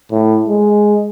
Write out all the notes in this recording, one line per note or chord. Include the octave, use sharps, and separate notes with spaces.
A2
G#3